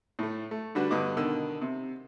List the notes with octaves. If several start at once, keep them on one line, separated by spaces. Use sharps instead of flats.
A2 A3
A3
D3 G3 D4 F#4 B4
G2 D3 B3 D#5 D6
B2 D3 D#3 E6
C3